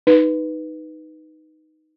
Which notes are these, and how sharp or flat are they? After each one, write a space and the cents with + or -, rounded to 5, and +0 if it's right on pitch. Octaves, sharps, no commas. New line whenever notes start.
D#4 +0 B4 +0